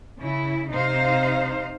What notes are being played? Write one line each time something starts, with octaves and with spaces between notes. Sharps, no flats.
C#3 E4
C3 D#4 C5 F5